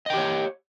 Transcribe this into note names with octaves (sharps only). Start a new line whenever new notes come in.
G4 C#5 D#5 G5